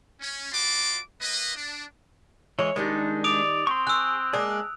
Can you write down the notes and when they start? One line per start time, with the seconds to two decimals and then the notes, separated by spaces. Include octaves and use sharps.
0.21 C#4
0.52 F4 F#4 D5 A5 C6 D6
1.21 A#3 B4 D#5
1.55 D4
2.59 E3 G#3 C#5
2.76 D#3 G3 G#3 D4 D#4
3.24 D5 D#6 D7 F7
3.67 C4 C6 C#6
3.87 G#4 E6 F#6
4.33 G#3 A#3 D4 G#4